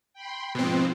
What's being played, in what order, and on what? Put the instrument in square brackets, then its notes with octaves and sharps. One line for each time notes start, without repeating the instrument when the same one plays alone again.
[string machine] G5 B5 C6
[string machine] G#2 F3 F4 [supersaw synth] B2 C4